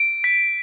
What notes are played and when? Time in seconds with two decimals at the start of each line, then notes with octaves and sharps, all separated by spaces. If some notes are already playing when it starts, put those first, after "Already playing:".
Already playing: D7
0.24 B6